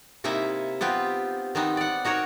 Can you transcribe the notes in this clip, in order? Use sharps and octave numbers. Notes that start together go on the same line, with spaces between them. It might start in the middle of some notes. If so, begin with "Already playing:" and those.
C3 A#3 D#4 E4 E5
B3 C4 F4 G4
D#3 B3 C4 D#4
D5 F#5
D#4 F#4 A#4 C#5